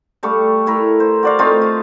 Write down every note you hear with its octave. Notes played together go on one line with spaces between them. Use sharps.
G3 A3 F5 C#6
A3 E4 A#4
C5
F#4 D5 F5
A3 C4 D#4 F4
F4